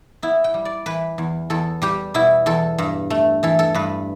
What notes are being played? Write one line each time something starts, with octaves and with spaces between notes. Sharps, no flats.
B3 E4
G5
G3
D5
E3 B4
E2
E2 A4
G3 G4
B2 E4
E2 A4
G2
A3
E3 A4
A4
G2 B4